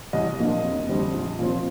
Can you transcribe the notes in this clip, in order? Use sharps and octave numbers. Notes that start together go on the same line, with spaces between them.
C2 D#5
A#2 F3 A#3 D4
F1
F2 D3 G3 C4
A#1
A#2 F3 C4